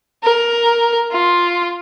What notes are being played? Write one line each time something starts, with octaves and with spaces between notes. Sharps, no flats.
A#4
F4